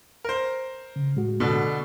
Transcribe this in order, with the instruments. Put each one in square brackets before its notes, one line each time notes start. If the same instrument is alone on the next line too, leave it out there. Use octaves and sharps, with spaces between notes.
[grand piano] A#4 C5
[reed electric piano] C#3
A2 G#3 F#4
[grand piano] B2 D3